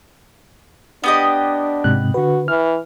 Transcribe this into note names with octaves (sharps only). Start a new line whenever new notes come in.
B3 D4 G4 D#5
G#2 C3 F#6
D3 F#4 B4
E3 F6